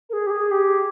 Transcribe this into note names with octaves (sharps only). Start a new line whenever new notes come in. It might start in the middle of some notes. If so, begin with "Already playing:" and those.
A#4
G#4
G4
G#4
G4